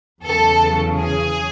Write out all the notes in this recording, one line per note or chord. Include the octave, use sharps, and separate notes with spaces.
E2 C#3 F#3 A4
G#4